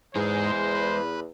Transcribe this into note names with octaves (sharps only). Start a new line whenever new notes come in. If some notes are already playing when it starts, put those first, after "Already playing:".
E2 G#2 G#3 G#4 C5
B4